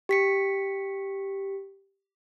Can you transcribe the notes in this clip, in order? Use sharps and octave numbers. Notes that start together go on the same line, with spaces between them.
G4 B6 C#7